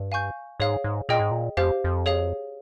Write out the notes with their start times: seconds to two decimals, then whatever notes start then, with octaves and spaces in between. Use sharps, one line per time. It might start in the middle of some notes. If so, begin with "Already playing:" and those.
Already playing: G2
0.12 F5 G#5 C#6 G6
0.60 G#2 G#4 C#5 F5
0.84 G#2
1.09 A#2 G#4 D#5 G5
1.20 G#2
1.31 A#2
1.57 F2 G4 C5 F5
1.84 F2
2.06 G#4 C#5 F5